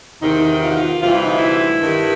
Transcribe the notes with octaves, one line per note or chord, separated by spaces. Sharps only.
E2 C3 D#3 D#4
F4
F#4
F4
D2 C3 E3 G3 F4
E4
D#4
E4
G2 D#3 G3